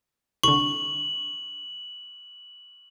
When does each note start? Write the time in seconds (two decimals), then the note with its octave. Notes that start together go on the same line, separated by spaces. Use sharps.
0.43 C2 D3 C#6 F#7